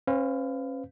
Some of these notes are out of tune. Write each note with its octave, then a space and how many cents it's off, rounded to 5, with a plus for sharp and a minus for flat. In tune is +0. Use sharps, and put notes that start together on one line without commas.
C#4 -35 B4 +35 F5 +0